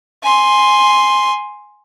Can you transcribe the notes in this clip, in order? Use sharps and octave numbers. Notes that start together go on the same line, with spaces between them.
G#5 C6